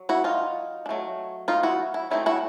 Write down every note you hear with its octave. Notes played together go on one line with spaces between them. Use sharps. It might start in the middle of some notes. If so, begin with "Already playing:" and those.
Already playing: F#3
E4 F#4
D#4 F4
D4
F#3 A3
D#4 F4
E4 F#4
E4
F#3 A3 C4 D#4 E4
E4 F#4